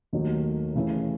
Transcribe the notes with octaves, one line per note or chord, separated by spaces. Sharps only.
D#2 D#3 F#3 A3 D#4
C#3 E3 A3 E4